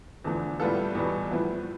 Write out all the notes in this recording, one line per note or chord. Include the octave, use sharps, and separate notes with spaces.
E2 D3 F3 A3 D4
A2 G3 B3 F4 A4
E2 B2 G3
A2 F3 B3 E4